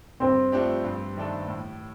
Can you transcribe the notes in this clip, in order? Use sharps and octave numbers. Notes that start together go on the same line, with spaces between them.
G2 C4
F3 A3 D4 G4
G2
D#3 A3 D4 A4
A2